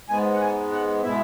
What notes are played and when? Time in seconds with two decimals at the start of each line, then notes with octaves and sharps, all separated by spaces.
0.09 G#2 G#3 B3 G#5
0.34 F#5
0.41 G#5
0.72 F#5
1.04 B2 G#3 B3 E4 E5